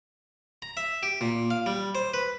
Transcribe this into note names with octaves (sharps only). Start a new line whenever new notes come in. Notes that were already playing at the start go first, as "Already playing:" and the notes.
A#5
E5
G4
A#2
F5
G3
C5
B4